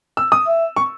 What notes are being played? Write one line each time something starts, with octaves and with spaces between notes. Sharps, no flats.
E6
D#6
E5
C#6